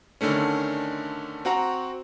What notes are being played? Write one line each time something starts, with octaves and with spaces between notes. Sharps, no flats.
D3 D#3 A3 C#4
C4 F#4 F#5 A#5